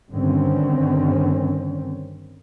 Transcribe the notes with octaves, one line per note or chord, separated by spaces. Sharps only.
G2 D3 D#3 C4 C#4